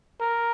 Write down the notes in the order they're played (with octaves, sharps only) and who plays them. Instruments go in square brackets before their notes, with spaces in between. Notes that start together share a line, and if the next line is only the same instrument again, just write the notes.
[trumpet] A#4